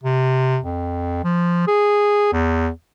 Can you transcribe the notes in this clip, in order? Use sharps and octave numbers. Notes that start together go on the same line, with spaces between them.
C3
F2
F3
G#4
E2